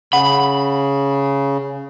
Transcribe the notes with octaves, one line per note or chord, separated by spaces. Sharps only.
C#3 F#5 B5